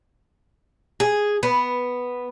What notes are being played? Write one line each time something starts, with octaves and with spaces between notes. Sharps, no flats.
G#4
B3